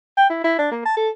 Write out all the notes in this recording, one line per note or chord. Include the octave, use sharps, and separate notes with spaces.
G5
E4
E4
D4
A#3
A5
A4